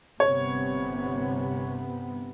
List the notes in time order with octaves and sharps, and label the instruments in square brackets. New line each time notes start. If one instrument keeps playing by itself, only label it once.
[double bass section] G1 C3 B3 [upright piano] C#5